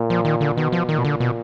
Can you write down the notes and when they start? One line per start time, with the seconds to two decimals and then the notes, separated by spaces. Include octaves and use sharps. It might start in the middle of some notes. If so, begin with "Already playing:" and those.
Already playing: A#2
0.10 F3
0.25 D#3
0.41 D3
0.57 B2 D#3
0.72 F3
0.89 A#2 D#3
0.98 B2
1.05 D3
1.20 B2